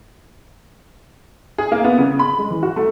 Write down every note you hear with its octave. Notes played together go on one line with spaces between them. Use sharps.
G#4
A#3
B3
C#3
B5
G#3
E3
F#4
A3